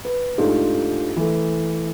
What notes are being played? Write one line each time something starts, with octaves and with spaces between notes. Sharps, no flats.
B4
G#2 A3 D4 D#4 F4 G4
E3 A3